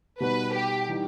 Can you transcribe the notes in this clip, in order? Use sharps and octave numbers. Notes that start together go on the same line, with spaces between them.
B2 G3 D#4 F#4 B4
G4
E3 G3 D#4